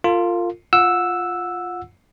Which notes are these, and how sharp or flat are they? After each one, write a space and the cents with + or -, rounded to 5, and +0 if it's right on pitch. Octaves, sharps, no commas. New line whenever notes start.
F4 +0 A#4 -45
F4 +0 F#5 -25 E6 +0